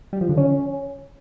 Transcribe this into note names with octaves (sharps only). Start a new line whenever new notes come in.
G3
F3
D3
C#4